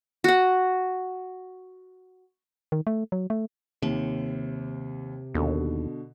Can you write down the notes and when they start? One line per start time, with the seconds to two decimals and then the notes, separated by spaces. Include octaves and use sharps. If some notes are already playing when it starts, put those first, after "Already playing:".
0.24 F#4 F#5
2.72 D#3
2.87 A3
3.12 F#3
3.30 A3
3.82 D#2 C3
5.34 D#2 B2 D3